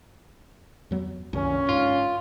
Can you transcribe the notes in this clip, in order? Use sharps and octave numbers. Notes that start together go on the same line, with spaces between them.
F2 F#3 B3
C2 F#2 A#2 D3 D#3 C#4
G#2 F4